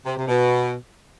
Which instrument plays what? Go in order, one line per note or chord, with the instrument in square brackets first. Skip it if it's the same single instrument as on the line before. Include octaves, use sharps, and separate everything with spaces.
[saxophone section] C3
C3
B2